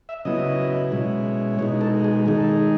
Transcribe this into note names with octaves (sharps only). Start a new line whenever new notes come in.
E5
C#3 F#3 B3 E4 D#5
B2 G#3 C#4 E4
B2 G#3 D#4 C#5
A4
G#4
D#3 G#3 D#4 G#4
A4
G#4